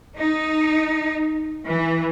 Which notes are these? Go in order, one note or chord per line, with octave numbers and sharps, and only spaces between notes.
D#4
E3